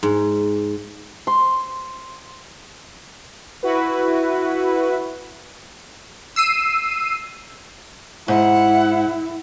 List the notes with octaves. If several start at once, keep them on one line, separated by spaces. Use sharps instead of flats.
G#2
C6
E4 F#4 B4
E6 C7 D#7
G#2 E4 F#5